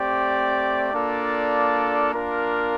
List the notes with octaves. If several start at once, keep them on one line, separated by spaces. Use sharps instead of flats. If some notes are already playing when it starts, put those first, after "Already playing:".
Already playing: A3 C4 G4 D5
A#3 D4 F4 A4 D5
A#3 D4 F4 A#4